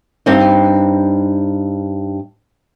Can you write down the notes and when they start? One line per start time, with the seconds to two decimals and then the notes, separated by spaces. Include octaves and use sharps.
0.26 G2 C4 D#4